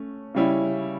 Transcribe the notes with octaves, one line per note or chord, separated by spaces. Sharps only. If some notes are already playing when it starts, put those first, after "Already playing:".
Already playing: A3 C#4
C#3 G3 C#4 E4